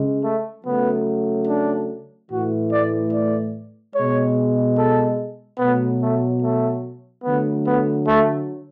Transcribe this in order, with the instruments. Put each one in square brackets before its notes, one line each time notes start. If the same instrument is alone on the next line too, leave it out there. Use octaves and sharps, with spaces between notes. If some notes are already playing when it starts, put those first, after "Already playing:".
Already playing: [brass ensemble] C#3 G#3
A3
C#3 F#3 A3 B3
D4
A2 E3 A3 F#4
D5
D5
B2 G#3 C#5
A4
B2 F#3 A3 B3
A3
A3
D3 F#3 A3 B3
B3
A3